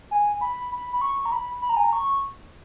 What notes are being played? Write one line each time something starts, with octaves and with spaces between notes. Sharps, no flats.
G#5
B5
B5
B5
C#6
A#5
B5
B5
A#5
G#5
A#5
C#6